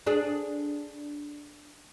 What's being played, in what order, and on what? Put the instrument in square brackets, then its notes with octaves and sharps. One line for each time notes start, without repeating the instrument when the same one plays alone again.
[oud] D4 G#4